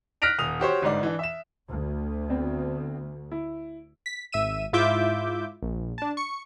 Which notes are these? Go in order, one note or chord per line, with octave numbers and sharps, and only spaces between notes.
F6 F#6 A#6 B6 D7 F7
D#1 D#6 F7
F#4 G4 C5 C#5
G1 G#2 D#4 D5
E3 D4
E5 E7
D2
B3 C4 D4
E4
B6
G#1 E5 E6 D#7 E7
G#2 E4 F4 E5 D6 G6
A#1
D4 A5
C#6 C#7